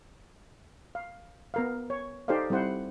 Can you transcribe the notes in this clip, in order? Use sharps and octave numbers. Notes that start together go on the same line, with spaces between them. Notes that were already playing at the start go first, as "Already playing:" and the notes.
F5
B3 A#4 F5
C#5
D#4 G4 A4 C5 D5 F5
G3 C4 E4 C5 F#5